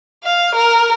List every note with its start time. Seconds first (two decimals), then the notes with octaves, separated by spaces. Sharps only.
0.24 F5
0.55 A#4